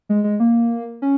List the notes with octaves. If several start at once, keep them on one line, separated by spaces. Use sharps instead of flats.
G#3
G#3
A#3
C#4